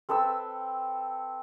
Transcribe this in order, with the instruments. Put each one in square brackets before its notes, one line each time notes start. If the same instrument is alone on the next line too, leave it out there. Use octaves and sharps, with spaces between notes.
[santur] C4 A4 B4 E6